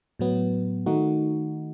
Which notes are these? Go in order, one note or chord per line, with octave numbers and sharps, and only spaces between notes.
A2 F#3 B3
D#3 A3 D#4 F#4